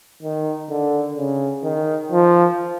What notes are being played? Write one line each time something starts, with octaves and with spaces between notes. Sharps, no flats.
D#3
D3
C#3
D#3
F3